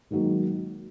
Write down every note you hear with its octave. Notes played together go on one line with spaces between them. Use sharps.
G#2 D#3 F#3 A#3